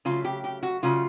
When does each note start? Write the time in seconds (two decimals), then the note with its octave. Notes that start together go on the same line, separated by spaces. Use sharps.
0.05 C#3 F#3 A3 F4
0.24 G4
0.44 G4
0.63 F#4
0.82 C#3 F#3 A3 F4